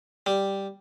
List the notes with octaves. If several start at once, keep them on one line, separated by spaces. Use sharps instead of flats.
G3